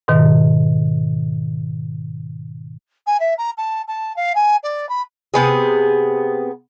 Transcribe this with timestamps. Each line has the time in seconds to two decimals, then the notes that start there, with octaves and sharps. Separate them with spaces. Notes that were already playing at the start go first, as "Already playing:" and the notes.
0.08 G#2 B2 D#3
3.07 G#5
3.20 E5
3.38 A#5
3.58 A5
3.88 A5
4.16 F5
4.35 G#5
4.63 D5
4.89 B5
5.34 C3 B3 G#4